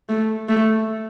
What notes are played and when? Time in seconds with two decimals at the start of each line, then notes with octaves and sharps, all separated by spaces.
0.09 A3
0.49 A3